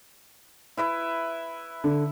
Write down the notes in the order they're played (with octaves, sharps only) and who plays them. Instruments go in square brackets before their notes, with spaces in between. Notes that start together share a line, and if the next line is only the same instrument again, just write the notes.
[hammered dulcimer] E4 B4 E5
[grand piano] D3